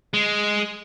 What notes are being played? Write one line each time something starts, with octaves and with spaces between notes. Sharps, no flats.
G#3